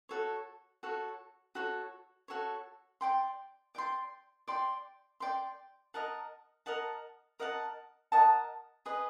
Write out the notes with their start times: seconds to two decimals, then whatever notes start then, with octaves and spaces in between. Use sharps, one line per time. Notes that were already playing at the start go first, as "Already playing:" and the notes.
0.09 F#4 A4 C#5
0.83 F#4 A4 C#5
1.55 F#4 A4 C#5
2.28 F#4 A4 C#5
3.01 D5 G5 C6
3.75 D5 G5 C6
4.48 D5 G5 C6
5.20 D5 G5 C6
5.94 A#4 D#5 F#5 A5
6.66 A#4 D#5 F#5 A5
7.40 A#4 D#5 F#5 A5
8.12 A#4 D#5 F#5 A5
8.86 G#4 B4 D#5